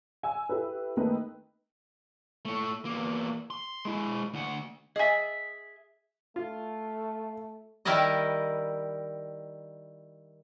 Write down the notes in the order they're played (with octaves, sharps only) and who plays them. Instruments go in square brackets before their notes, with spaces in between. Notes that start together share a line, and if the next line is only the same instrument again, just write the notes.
[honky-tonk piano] G#5 E6
E4 G4 A4 B4
D#3 A3 A#3 C4 D#4 B4
[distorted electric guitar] A3 C#5
E2 A#3
C6
G#3 E4
D2 F#5
[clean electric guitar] G#4 E5 [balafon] D#5 G#5
[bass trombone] A3 [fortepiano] F4
[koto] D#3 G3 E4 A#4 D5 D#5